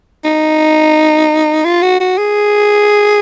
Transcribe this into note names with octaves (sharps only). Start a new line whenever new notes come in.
D#4
F4
F#4
F#4
G#4